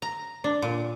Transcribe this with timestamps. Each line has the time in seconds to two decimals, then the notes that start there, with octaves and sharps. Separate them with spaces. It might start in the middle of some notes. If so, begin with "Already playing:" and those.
0.02 A#5
0.44 D4
0.62 A#2